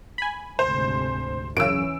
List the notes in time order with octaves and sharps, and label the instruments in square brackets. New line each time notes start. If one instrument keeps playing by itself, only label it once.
[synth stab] G#5 B5
[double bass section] D2 G#2 C3 [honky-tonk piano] C5
[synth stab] F#2 C#3 [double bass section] E3 C#4 [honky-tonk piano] E6 D7